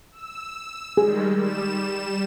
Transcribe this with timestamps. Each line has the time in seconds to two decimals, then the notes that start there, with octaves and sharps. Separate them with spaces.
0.12 E6
0.97 D#3 G3 G#3 G#4
1.37 G3 E7